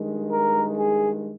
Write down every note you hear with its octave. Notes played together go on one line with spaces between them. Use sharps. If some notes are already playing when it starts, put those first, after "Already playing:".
Already playing: G2 D#3 G#3
A#4
G#4